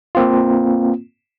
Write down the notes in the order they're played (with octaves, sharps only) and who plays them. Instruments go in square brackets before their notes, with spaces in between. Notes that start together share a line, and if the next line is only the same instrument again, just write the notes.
[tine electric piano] A#3 C4 F4